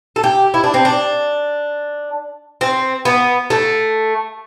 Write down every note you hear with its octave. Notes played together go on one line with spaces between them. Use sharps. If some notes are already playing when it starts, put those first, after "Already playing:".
A4
G4
E4
D4
C4
D4
C4
B3
A3